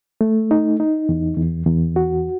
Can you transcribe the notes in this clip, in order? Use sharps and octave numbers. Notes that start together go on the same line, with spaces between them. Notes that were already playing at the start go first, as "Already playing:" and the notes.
A3
D#4
D#4
E2
E2
E2
F#4